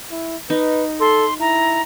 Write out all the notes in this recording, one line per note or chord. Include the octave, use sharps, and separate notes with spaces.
E4
D#4 B4
A4 C6
E4 A#5